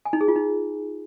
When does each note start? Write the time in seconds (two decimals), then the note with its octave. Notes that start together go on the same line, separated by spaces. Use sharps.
0.05 G#5
0.13 D#4
0.21 G#4
0.28 F4
0.36 D#4